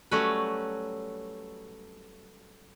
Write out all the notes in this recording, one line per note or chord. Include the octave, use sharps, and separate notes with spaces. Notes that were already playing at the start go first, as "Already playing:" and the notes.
F#3 G3 A3 C#4 F#4 B4